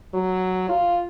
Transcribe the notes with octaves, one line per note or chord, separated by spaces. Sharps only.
F#3
F4